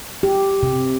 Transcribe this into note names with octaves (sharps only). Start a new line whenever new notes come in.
G4
C3